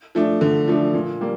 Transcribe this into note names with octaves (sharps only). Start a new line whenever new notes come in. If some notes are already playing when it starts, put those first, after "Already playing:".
F3 A3 D4
D3
F3 A3 D4
A#2
G3 A#3